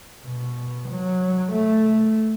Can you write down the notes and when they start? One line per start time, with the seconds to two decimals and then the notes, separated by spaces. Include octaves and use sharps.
0.26 B2
0.90 F#3
1.53 A3